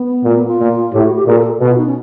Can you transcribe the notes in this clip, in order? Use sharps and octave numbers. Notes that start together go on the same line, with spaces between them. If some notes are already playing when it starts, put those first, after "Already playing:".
Already playing: B3
A#2 A#3
B3
F4
A#2
A2 G4
F#4
G4
A#2 G#4
A4
B2 F#4
F4
D#4
C#4